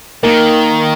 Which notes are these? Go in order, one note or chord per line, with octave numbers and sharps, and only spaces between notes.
D#3 A#3